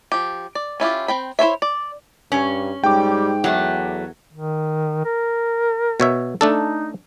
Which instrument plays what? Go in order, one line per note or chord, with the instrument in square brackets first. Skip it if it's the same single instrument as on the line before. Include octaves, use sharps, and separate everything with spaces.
[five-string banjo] F3 G4
D5
C#4 E4 F4 G4
C4 G5 B5
E4 C5 C#5 E5
D5
[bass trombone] G2 [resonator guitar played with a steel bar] C#4
[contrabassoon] G#2 [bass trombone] G3 [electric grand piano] G5 D6
[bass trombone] E2 [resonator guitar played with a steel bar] F#3 A3
[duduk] D#3
A#4
[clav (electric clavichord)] B2 C#5 E5
[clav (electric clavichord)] A3 D4 A4 [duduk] D#4